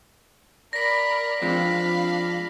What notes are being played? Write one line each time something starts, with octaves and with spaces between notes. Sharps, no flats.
A#4 D5 B5 A#6 B6
F3 G#3 C4 D4 F5 B5